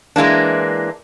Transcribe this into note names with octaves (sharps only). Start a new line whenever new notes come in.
E3 G#3 A#3 D4